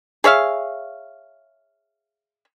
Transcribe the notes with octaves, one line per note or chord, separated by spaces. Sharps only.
G#4 C#5 E5 F5